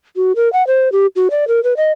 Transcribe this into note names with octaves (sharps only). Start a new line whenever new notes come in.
F#4
A#4
F#5
C5
G4
F#4
D5
A#4
B4
D#5